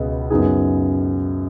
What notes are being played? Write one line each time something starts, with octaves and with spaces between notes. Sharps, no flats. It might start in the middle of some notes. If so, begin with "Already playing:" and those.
Already playing: C#2 B2 B3 G#4
F#2 C#3 B3 D#4 G#4